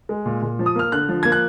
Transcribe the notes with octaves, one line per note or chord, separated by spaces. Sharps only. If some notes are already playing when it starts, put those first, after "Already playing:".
G#3
A#2
A#2
F3
D#6
A#3 F6
D3 F#6
F3
A#3 G#6
F#6